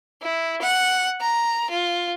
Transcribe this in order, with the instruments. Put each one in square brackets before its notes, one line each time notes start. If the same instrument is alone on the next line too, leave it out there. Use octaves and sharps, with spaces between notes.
[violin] E4
F#5
A#5
F4